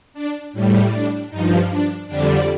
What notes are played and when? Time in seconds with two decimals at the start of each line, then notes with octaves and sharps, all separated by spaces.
0.13 D4
0.53 A2 G3
0.91 D4
1.30 G2 F3 D#4
1.69 D4
2.07 F2 D3 G3 D4